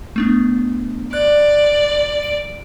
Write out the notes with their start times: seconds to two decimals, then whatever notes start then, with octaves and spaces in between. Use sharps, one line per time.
0.16 A3 B3 D4
1.13 D5 F#6
2.23 D7